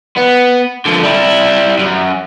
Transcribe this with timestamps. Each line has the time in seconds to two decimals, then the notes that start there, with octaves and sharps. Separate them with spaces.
0.18 B3
0.86 D3 F3
1.03 G3 E4
1.79 F#2